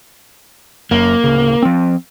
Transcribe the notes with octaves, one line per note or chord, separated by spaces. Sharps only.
F#1 F#2 A#3
D1 C#3
F3 C4